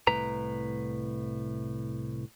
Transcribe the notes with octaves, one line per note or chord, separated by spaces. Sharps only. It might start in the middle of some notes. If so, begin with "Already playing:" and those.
C2 A2 B4 A#5